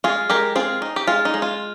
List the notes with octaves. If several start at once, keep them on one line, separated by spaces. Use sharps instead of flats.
G#3 F4 G#4
G#3 G4 A#4
C4 F4 G#4
D#4
G4
G#3 F4
D#4
G#3
F4